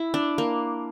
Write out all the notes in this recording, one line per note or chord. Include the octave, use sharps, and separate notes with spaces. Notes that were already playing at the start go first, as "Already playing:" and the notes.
Already playing: E4
D4
A#3